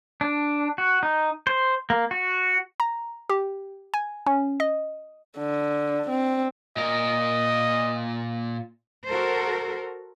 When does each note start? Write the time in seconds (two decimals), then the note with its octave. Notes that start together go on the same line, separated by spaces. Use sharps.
0.21 D4
0.78 F#4
1.03 D#4
1.47 C5
1.90 A#3
2.11 F#4
2.80 A#5
3.30 G4
3.94 G#5
4.27 C#4
4.60 D#5
5.38 D3
6.10 C4
6.77 A#2 A#4 D#5
9.08 F#4 A4 A#4 C5